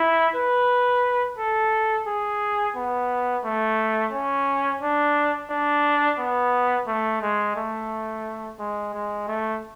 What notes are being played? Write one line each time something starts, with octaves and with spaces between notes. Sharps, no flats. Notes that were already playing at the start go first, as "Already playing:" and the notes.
Already playing: E4
B4
A4
G#4
B3
A3
C#4
D4
D4
B3
A3
G#3
A3
G#3
G#3
A3